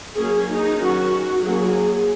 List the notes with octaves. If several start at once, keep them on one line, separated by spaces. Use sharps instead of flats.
F#3 A#3 C#4 G#4
D#4
D#3 F#3 C#4 F#4
F#3 A#3 C#4 G#4